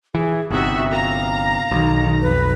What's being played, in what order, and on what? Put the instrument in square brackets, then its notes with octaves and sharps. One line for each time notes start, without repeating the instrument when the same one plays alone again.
[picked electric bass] E3 [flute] G#4
[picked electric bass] G1 C3 [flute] D#4 [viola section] F#4 E5
[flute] F5 [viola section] A#5
[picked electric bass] B1 [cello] D#3
[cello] F2 [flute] B4